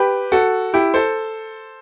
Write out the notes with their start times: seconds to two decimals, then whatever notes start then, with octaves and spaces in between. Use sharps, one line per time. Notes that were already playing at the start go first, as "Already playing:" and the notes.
Already playing: G4 B4
0.32 F#4 A4
0.74 E4 G4
0.94 A4 C5